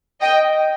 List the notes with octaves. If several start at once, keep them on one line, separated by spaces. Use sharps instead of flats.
D#5 G5